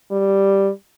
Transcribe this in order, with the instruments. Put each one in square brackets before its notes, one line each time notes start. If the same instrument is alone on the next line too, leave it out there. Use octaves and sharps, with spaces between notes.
[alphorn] G3